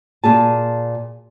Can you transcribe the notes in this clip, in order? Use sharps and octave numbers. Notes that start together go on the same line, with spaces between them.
A#2 G#4 A5